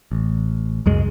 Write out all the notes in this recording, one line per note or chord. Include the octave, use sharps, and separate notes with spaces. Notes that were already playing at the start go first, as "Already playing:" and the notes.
A1
C#2 F#2 G#3